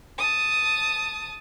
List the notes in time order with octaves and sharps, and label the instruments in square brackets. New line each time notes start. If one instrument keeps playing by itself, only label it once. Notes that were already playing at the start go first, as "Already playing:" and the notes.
[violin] A5 D#6